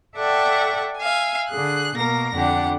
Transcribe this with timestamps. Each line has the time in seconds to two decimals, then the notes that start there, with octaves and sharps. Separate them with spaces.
0.16 A4 D5 E5 F#5 G5 C#6
0.99 E5 F5 G#5
1.49 D3 G#4 F#6
1.96 B2 A#3 A#4 A#6
2.35 F2 D3 D4 G4 F#5